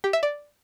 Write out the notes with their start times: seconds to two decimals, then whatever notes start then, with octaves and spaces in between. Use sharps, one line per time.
0.04 G4
0.13 E5
0.23 D5